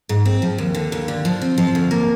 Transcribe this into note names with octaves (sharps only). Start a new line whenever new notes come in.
G#2
C4
F3
D#2
D3
D#2
D3
F3
C4
F3
D2
A#3